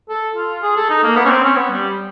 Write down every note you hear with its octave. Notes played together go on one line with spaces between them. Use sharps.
A4
F4
G#4
A4
D#4
A#3
B3
C#4
C4
C#4
B3
G3